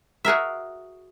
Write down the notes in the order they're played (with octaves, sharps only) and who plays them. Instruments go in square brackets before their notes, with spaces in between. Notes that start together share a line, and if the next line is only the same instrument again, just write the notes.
[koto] F#4 G#4 A#4 E5